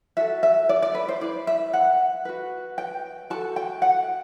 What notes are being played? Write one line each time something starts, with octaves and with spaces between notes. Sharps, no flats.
F#4 A4 E5
E5
D5
D5
B4
C5
E4 B4 D5
E5
F#5
F#4 B4
G5
F#4 A4 A5
G5
F#5